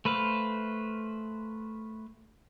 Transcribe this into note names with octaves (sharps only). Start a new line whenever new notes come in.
A3 B4 C5 F5